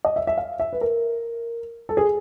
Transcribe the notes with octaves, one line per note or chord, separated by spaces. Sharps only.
D#5
E5
E5
F5
E5
B4
A#4
A4
G#4